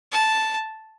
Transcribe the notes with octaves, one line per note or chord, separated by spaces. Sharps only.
A5